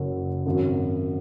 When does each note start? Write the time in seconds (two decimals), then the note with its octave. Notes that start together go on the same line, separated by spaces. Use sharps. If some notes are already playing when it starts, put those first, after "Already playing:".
Already playing: F#1 F#2 F#3 C#4 F#4
0.46 G#1 F#2 F#3